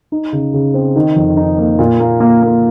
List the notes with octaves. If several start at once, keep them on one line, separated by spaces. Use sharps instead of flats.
D#4
C#3
C#3
C4
D#3
F2
D#4
A#3
A#2
A#3
A#3
A#3